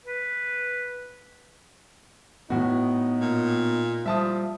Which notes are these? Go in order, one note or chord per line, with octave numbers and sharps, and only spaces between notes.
B4
A2 B3 D#4 F#4
A#2
F3 G3 E5 A5 D#6